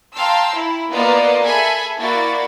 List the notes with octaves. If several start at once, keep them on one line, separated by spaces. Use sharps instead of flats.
F5 G5 A5 A#5 C6 E6
E4
A#3 B3 F4 D5 D#5
G#4 A4 E5 G#5 B5
A#3 E4 F#4 D5 A6